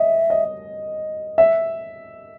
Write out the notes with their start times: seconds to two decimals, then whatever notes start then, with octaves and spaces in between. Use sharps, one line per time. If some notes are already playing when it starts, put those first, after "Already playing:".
Already playing: D#5 E5
0.30 D#5
1.38 E5